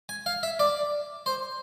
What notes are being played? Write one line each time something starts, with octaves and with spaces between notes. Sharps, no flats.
G#5
F5
E5
D5
C5